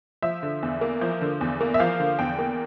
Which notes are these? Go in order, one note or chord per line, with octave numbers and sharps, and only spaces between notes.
F3 E5
D3
E2
A#3
F3
D3
E2
A#3
E5
F3 F5
D3
E2 G5
A#3